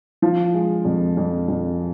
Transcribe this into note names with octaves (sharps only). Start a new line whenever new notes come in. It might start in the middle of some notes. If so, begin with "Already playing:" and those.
F3
G#3
F2
F2
F2